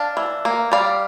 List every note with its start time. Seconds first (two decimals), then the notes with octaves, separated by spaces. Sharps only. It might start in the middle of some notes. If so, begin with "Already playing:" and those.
Already playing: D4 F5 A5
0.17 E3
0.45 A#3
0.72 G3 D5 F5